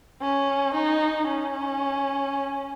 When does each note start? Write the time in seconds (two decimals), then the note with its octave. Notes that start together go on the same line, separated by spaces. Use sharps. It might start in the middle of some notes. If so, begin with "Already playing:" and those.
0.21 C#4
0.74 D#4
1.28 C#4